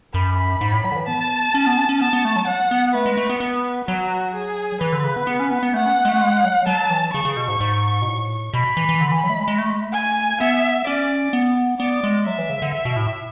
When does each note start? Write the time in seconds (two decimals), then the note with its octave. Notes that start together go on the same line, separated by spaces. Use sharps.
0.14 F#2 B5
0.61 G#2
0.72 A2
0.84 F#3
0.92 D3
0.96 E3
1.07 B3 A5
1.54 C#4
1.67 B3
1.77 C#4
1.89 C#4
2.00 B3 A5
2.13 B3
2.25 A3
2.36 F#3
2.47 F#5
2.71 B3
2.94 A3 B4
3.06 G#3
3.17 A3
3.30 B3
3.40 B3 B4
3.88 F#3 F#4
4.34 G#4
4.81 E3 B4
4.92 D3
5.04 C#3
5.16 B3
5.27 B3
5.40 C#4
5.51 B3
5.63 B3
5.74 A3 F#5
5.86 C#4
5.97 B3
6.05 G#3
6.09 A3
6.21 G#3
6.44 F#3
6.67 F#3 A5
6.90 E3
7.14 C#3 C#6
7.25 C#3
7.37 B2
7.48 G#2
7.60 G#2
8.02 B2
8.08 A2
8.54 B2 B5
8.77 E3
8.89 E3
9.01 D3
9.11 E3
9.24 F#3
9.29 A3
9.35 G#3
9.48 G#3
9.58 A3
9.70 G#3
9.81 A3
9.93 G#5
10.41 B3 E5
10.87 C#4 D5
11.33 B3
11.80 B3 D5
12.03 G#3
12.26 F#3 E5
12.38 E3
12.50 C#3
12.62 D3
12.74 E5
12.85 B2
12.96 A2